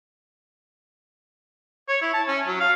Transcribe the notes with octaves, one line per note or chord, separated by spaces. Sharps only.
C#5
E4
A5
C#4
F#3
F5